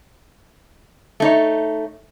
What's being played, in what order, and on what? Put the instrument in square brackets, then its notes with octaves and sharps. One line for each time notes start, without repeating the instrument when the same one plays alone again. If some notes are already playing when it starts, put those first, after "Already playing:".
[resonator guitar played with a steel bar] A3 D#4 C#5